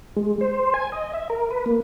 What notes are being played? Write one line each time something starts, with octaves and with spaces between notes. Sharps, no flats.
G#3
C5
G#5
D#5
E5
A#4
B4
A#3